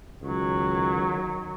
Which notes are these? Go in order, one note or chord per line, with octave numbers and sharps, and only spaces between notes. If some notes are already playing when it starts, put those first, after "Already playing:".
C#2 D#3 F#3